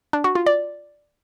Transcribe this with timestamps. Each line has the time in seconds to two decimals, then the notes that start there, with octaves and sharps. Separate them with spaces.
0.13 D4
0.24 F#4
0.35 F4
0.46 D5